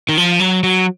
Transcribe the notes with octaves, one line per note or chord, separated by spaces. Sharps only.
D#3
F3
F#3
F#3